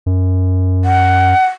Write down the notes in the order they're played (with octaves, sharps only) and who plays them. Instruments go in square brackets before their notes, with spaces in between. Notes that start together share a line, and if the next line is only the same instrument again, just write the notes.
[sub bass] F#2
[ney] F#5